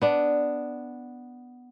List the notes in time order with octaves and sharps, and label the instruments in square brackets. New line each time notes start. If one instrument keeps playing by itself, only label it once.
[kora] B3 D4